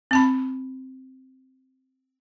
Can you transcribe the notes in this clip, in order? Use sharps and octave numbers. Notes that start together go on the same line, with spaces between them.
C4 A5 B5